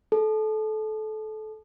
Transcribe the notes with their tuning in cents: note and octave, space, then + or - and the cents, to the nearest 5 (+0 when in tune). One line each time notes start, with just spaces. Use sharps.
A4 -25